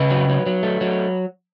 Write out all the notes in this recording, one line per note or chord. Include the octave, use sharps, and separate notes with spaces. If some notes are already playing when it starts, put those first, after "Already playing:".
Already playing: C#3 B4
F#3
F#3
F#3
A3
F#3